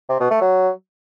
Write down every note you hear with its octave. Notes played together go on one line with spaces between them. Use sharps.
C3
B2
A3
F#3